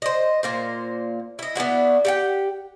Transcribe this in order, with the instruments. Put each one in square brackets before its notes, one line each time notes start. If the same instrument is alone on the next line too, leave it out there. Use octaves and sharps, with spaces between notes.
[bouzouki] C5 D#5
A#2 A#3 C5
E4 D#5
B3 D4 E4 F#4
G4 F#5 G5